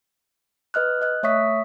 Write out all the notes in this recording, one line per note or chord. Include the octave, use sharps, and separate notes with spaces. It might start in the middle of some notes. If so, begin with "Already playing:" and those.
B4 D#5 F6 F#6
D#5 F#6
A3 C#5 E5 C#6 D#6 B6